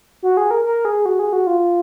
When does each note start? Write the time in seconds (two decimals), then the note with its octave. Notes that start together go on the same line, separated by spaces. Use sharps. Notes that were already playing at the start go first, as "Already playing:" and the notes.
0.23 F#4
0.37 G#4
0.51 A#4
0.65 A#4
0.85 G#4
1.06 F#4
1.19 G#4
1.33 F#4
1.47 F4